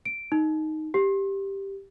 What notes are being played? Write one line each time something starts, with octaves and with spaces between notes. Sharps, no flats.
D7
D#4
G4